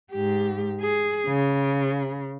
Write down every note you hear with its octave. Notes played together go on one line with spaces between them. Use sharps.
G#2 G4
G#4
C#3